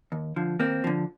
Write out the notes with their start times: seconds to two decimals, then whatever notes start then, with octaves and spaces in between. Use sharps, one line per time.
0.12 D#2
0.36 D3 F3
0.59 D#2 A#3 C4
0.84 D3 F3